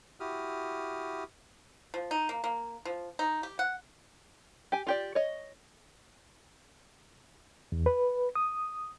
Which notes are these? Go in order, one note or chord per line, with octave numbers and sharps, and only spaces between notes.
E4 F#4 G4 D#6 F6
F3
D#4
A#3
A#3
F3
D#4
G4
F#5
G4 G#5
F4 G4 D5
C#5 D#5
E2
B4
D#6